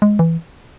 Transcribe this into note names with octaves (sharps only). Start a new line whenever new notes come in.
G#3
E3